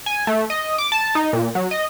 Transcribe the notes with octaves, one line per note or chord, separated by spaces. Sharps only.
G#5
A3
D#5
D6
A5
D#4
A#2
F#3
D#5